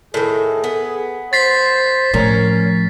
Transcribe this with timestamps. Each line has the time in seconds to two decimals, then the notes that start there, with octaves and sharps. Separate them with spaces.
0.14 A2 D#3 G#4
0.64 B3
1.33 C5 A6 B6 C7
2.14 A2 F3 C#4 A#4